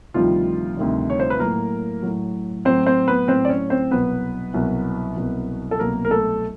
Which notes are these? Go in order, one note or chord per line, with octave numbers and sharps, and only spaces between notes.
D2 C3 D#3 F3 G3 F4
D2 C3 D#3 G3
C#5
C5
B4
A2 F#3 A#3 A#4
A2 F#3
A2 F#3 C4 C5
C4 C5
B3 B4
A2 F#3 C4 C5
D5
C#4 C#5
C4 C5
C2 B2 F#3 B3 B4
C2 B2 F#3
C2 B2 F#3
A4
C2 B2 F#3 A#3 A#4
A#4
A3 A4